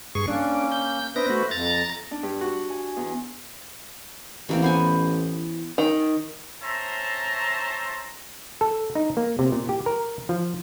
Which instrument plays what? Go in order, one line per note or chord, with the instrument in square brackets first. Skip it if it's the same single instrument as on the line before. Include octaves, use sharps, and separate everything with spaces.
[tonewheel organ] G2 G#4 C#6
[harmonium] A#3 C#4 [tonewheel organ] D4
[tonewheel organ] G6
[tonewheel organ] B3 D4 A#6 [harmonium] B4 C5 E5
[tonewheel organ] A3 F#4
[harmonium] F2 [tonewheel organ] A#5 A6
[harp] D4
G2
F#4
G#5
E2
[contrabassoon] A1 [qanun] E3 A#3 C4
[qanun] B3 C5 G#5
[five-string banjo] D#3
[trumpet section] C#4 C5 E5 A5 A#5 C6
[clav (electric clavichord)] A4
D#4
A#3
C3
A#2
G4
A#4
F3